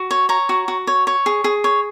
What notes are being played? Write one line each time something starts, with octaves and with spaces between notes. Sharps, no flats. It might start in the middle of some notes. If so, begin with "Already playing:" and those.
Already playing: F#4
C#5
C#5 A#5
F#4
F#4
C#5
C#5
G#4
G#4
C#5